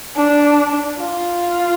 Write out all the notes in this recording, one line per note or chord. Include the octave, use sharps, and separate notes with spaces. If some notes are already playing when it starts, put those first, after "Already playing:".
D4
F4